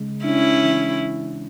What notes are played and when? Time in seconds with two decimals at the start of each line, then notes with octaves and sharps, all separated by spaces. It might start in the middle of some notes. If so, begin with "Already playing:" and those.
Already playing: C#3 G#3
0.25 C#4 D4 E4
0.63 E3